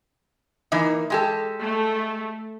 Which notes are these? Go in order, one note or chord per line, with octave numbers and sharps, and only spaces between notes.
E3 A#3 D#4
G#3 G4 A4
A3